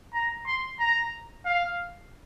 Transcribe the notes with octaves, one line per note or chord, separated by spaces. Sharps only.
A#5
C6
A#5
F5